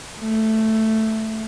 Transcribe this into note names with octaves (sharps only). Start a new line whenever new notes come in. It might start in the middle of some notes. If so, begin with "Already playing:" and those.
A3